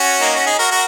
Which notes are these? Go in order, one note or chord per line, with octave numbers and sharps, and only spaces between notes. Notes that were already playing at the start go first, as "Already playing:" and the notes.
Already playing: C#4 F#4
A#3 D#4
C#4 F#4
D#4 G#4
F#4 A#4
F#4 A#4